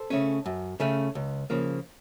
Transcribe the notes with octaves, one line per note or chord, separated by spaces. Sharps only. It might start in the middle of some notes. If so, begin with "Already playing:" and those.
Already playing: A4 C5
C#3 A3 C#4
F#2
C#3 A3 C#4
C#2
C#3 F3 A#3